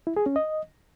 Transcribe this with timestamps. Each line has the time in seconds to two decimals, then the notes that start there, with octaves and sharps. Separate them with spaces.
0.07 E4
0.17 G#4
0.26 C#4
0.36 D#5